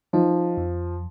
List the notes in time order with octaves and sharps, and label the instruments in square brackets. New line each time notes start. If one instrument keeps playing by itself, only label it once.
[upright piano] F3 [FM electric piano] D#4
[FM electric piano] F2